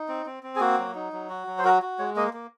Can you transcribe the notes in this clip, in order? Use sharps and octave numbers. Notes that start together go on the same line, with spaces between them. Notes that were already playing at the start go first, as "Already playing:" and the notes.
Already playing: D#4
C4
C4
C4
G#4
A#3 F#4
F#3
D#4
F#3
F#4
F#3
C5
F#4 A#4
F#4
G#3 C#5
A#3 D#5
A#3